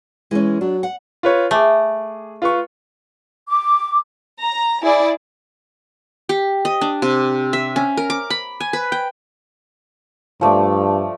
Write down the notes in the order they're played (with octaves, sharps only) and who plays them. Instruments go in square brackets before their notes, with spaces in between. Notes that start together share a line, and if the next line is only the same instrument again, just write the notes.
[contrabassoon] E3 [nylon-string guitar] G#3 C#4
[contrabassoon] F#3 [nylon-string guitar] D4
[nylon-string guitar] F#5
[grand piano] F4 B4 C#5
[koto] A3 [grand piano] G#4 D6
[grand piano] F4 B4 C#6
[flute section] D6
[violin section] A#5
E4 G#4 D5
[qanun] G4
D#5
D4
C3
E5
C#4
A#4
D6
B5
G#5
B4
G5
[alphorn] G2 [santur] F3 A3 D5